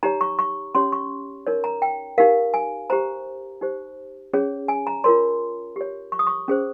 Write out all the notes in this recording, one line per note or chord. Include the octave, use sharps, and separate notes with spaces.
D#4 G4 C#5 A#5
C#6
C#6
C#4 G4 C#5 C6
C#6
D#4 A#4 C#5
A#5
G5
D#4 G4 A#4 F5
G#5
G4 C5 A#5
D#4 G4 C5
C#4 G#4 C#5
G#5
A#5
F4 A#4 C#5 C6
G4 C#5
C#6
D#6
C#6
C#4 G#4 C5